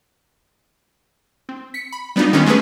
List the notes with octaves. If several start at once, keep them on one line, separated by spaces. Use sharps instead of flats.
C4
B6 C#7
B5
G3 B3 D4 D#4 F4
D#3 G3 G#3 B3 C#4
G#3 A3 C#4 G#4 B4